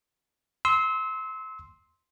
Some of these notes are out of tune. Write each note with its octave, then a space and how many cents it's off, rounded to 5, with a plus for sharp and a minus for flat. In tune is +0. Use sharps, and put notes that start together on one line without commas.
C6 +0 E6 -30